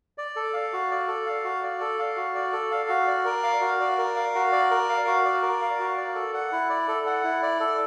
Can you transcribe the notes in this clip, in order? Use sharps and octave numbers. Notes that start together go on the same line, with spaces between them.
D5
A4
F5
F#4
D5
A4
F5
F#4
D5
A4
F5
F#4
D5
A4
F5
F#4
D5
A#4
F5
F#4
D5
A#4
F5
F#4
D5
A#4
F5
F#4
D5
A#4
F5
F#4
D5
A4
F#5
E4
D5
A4
F#5
E4
D5
A4